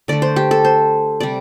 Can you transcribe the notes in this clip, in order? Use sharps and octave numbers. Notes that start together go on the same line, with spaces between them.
D3 A3 D5
C5
G4
A4
C5
C3 G3 D5